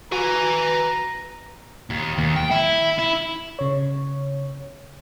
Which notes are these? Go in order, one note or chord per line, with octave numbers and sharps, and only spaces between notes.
F#4 B4 G#5 A#5
D#2
D#2
G5
E4
E4
C#3 C#5